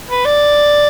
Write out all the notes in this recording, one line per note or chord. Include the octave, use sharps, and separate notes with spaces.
B4
D5